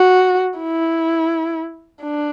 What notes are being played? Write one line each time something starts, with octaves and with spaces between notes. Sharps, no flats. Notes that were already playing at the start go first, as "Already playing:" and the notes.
Already playing: F#4
E4
D4